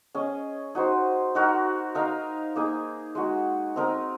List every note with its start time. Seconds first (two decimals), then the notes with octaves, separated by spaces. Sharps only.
0.15 C#4 G#4 D#5
0.75 D#4 F#4 C5
1.35 D#4 F#4 A#4
1.95 D#4 A#4 F5
2.56 A#3 D#4 G#4
3.15 G#3 D#4 F#4
3.76 C4 D#4 A#4